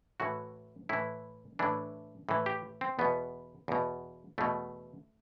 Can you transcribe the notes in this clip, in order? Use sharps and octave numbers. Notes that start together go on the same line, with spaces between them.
A2 E3 F#4
A2 E3 E4
A2 E3 D4
A2 E3
G4
C4
E2 B2 B3
E2 B2
E2 B2 A3